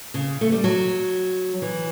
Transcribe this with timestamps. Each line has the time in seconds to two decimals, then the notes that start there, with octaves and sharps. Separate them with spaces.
0.14 C#3
0.41 A3
0.52 G3
0.64 F#3
1.62 E3